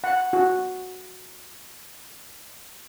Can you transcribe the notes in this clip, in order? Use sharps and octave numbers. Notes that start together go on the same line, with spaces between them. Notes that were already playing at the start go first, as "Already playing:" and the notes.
F#5
F#4